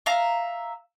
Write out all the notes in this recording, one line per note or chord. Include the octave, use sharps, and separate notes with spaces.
E5 F5 A#5